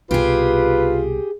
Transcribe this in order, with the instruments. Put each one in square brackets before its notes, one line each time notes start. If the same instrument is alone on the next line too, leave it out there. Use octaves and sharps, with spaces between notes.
[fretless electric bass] C2 B2 [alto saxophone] F4 [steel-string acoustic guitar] G4 G#4 [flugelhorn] B4